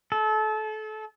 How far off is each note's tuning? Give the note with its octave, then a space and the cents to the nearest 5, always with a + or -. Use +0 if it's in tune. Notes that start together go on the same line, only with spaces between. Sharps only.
A4 -30